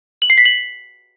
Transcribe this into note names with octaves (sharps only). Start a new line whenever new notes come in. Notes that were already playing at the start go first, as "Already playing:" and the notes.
F#7
C7
B6
F#7